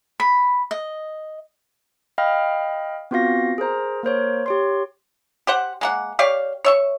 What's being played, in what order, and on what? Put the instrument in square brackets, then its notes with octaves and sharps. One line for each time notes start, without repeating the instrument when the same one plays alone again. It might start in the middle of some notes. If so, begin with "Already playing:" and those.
[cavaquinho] B5
D#5
[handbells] D#5 F5 G5 B5 F6
B3 C4 F4 F#4 F5 A#6
G#4 A#4 C5 A#5
A#3 A#4 C5 C#5
G4 C#5 C6
[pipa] G4 C5 F#5
G#3 A#3 F#5
G4 C#5 D5 F5
C#5 E5 C#6